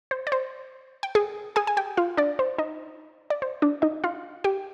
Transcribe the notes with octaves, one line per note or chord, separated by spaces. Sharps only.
C5
D5
C5
G5
G#4 G#5
G#4 G#5
G#5
G4 G5
F4 F5
D4 D5
C5
D#4 D#5
D5
C5
D4 D5
D#4 D#5
F4 F5
G4 G5